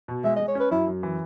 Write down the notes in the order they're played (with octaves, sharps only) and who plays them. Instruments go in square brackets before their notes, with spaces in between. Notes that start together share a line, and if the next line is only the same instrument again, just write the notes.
[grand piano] B2
[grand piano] G#3 [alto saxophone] E5
[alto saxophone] D#5
[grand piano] G#3
[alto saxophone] C#5
[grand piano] C#4 [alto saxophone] B4
[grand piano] F#2 [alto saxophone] E4
[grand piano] F#2
E3